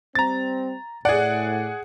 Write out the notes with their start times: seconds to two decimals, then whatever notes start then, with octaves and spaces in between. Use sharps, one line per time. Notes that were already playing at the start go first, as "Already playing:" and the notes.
0.15 G3 C4 A#5 A6
1.05 A2 G#4 D5 F#5